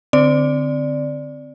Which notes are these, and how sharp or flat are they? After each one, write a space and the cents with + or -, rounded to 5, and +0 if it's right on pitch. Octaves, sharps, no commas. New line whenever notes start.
D3 +0 C4 -20 D5 +0